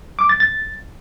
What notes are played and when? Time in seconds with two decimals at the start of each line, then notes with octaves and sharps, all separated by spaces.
0.19 D6
0.29 A6
0.40 A6